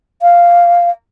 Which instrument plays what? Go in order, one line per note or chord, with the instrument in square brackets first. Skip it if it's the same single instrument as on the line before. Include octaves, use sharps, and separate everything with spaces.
[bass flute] F5